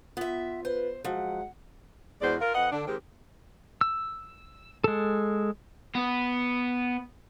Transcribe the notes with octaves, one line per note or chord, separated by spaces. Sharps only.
B3 F4 E5
B4 C5
F3 F#3 G#3 F#5
E2 G#3 B3 F#4 C5 D5
F4 A#4
F2 B4 D#5 F#5
D3 D4
D#3 G#3 C4 G4
E6
G#3 A4
B3